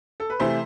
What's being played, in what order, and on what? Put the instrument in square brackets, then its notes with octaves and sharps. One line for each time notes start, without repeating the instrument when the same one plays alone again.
[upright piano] A4
B4
C3 E3 A3 E4 C5